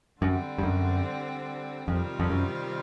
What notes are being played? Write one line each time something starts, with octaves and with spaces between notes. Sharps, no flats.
F#2 D3 G3 C4
G2
F#2
F2 C3 D#3 G3 C4 F4
F2
F#2